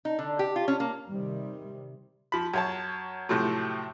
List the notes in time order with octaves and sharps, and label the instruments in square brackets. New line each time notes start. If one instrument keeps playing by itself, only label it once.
[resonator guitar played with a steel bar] D#4
D3
G4
F4
C#4
A#3
[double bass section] C3 D#3 G3
[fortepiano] F3 B5
F#2 C#5 A5
A2 C3 F3 F#3 A3